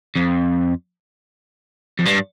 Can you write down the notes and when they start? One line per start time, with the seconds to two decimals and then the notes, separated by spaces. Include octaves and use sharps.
0.16 F2
1.99 F2
2.06 G2